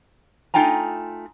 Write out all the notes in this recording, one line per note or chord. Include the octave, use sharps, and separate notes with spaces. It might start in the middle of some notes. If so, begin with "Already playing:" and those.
A3 D#4 F4 G5 G#5 A#5